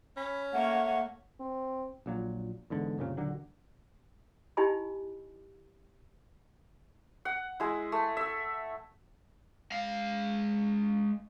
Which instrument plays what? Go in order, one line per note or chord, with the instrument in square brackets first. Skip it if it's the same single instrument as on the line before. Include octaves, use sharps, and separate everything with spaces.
[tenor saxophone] C#4 [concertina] B5
[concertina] A3 [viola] A#3 C#5 [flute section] F#5
[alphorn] C4
[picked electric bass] A#1 A#2 F#3
E2 G#2 D3
F#1 C2 A#2 C#3
D#1 D3 D#3 F#3
[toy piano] D#4 E4 G4 D#5 G#5 B5
[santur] F#5
G#3 E4
A3
E5 E6
[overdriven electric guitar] G#3 F5